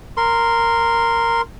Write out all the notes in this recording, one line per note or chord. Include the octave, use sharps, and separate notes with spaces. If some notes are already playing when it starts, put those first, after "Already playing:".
A#4 C6